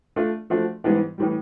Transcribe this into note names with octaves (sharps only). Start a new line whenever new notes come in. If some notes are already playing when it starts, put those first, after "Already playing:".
A3 D4 F4
F3 A3 D4 F#4
G#2 E3 G3 B3 D4
A2 E3 G3